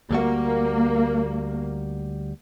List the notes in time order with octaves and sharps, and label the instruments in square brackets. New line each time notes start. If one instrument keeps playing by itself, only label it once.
[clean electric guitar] D2 G3 F#4 [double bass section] A#3